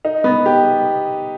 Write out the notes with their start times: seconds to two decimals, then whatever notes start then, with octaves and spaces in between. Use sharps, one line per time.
0.05 D#4
0.24 B3
0.46 G4